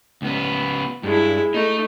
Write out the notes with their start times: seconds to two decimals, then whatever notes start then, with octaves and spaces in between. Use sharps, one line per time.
0.22 C#2 B3
1.03 G2 G#3 E4
1.54 A3 D#4